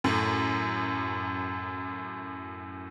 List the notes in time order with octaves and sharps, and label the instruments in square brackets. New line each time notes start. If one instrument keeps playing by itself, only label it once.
[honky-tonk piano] F#2 A2